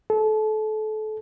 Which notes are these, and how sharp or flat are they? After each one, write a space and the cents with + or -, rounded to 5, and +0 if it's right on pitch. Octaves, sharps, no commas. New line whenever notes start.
A4 -30